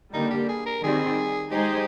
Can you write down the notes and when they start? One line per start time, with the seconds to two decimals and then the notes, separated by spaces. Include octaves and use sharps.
0.13 D3 G3 A#3 D4 D#4
0.30 G4
0.48 G#4
0.66 A#4
0.83 D#3 G3 C4 G#4
1.52 G#3 D#4 G4 G#4 C5